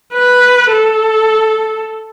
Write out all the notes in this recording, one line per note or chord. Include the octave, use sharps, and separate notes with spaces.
B4
A4